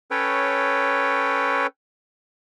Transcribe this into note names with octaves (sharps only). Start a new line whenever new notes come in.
C#4 A4 B4 C#5 G5